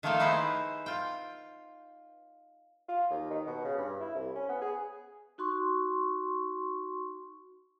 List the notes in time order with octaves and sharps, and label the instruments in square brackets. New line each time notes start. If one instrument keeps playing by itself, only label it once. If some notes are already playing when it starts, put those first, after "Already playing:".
[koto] D#3 F3 A3 A#3 F5 G5
D#4 E4 G#4 B4 C5
F4 G5
[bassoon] F4
D#2
D#3
B2
C#3
G2
E4
C2
C#4
B3
G#4
[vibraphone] D#4 F#4 C6 C#6